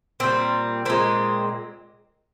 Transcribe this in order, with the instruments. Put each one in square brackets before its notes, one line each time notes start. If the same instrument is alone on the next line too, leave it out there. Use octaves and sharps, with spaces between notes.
[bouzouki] A#2 G3 C4
A#2 G#3 C4